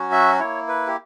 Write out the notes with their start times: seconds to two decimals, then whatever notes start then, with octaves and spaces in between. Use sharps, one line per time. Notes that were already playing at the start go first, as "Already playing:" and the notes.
Already playing: F#3 C#4 F#4
0.12 E5
0.39 A#3 E4 C#5
0.68 B4
0.87 G4